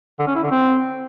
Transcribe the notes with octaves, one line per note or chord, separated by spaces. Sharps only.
D3
C#4
E4
D3
C4